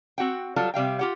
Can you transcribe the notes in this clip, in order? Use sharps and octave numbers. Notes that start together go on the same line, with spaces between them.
C4 F#4 F#5 G5
F#3 G3 F4 A4
C3 G3 F5 G5
F4 G4 F#5